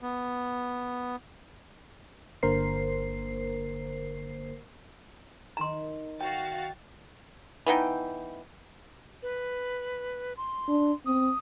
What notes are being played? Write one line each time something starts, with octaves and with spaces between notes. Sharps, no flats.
B3
G1 D3 A#3 A#4 C5 C7
D#3 E4 A#5 C6
F#4 F5 G5 A6
E3 B3 D#4 G5
B4
C6
D4
C4 D#6